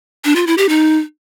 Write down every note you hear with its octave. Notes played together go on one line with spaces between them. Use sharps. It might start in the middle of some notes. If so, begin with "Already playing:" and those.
D4
F4
E4
G4
D#4